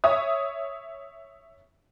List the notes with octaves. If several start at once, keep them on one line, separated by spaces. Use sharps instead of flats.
C#5 E5 D#6